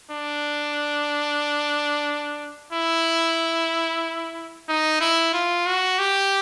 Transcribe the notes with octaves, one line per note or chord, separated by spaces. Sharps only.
D4
E4
D#4
E4
F4
F#4
G4